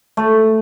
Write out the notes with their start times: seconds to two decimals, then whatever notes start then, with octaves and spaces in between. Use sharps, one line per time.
0.17 A3